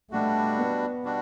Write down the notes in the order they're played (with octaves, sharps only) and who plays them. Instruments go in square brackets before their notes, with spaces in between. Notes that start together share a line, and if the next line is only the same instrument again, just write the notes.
[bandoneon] B2 G3 D4 F#4 [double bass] A3
[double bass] B3
[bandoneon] B2 G3 D4 F#4